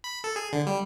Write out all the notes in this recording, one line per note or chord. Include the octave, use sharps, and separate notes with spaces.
B5
A4
G#4
D3
G3